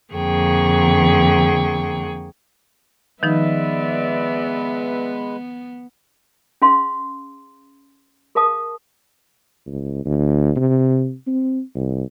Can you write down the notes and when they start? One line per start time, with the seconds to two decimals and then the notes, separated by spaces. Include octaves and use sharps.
0.13 F2 D3 A#3 G#4 G5 C#6
3.23 D#3 F3 G#3 B3 D#4 B4 D5 E5
6.62 C#4 G#4 F5 C6
8.35 G#4 A#4 F5 A5 D#6
9.67 C#2
10.05 D2
10.57 C3
11.27 C4
11.76 C2